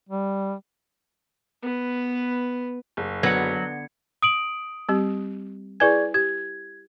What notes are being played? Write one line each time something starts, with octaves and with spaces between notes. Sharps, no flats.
G3
B3 B4
F#1
D3 F#3 B3 B4 G#6 C#7
D#6 D7 F#7
G3 C4 G4
E4 G#4 B4 D5 G#5 G#6
G4 G#6